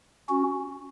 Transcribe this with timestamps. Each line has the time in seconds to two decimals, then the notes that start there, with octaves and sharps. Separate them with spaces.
0.29 C#4 F#4